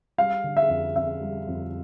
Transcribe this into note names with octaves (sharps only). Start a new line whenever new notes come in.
G3 F5
D3
E5
F2
F2 E5
G3
F2